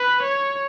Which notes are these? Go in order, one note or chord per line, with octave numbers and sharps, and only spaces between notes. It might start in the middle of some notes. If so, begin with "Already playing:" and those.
Already playing: B4
C#5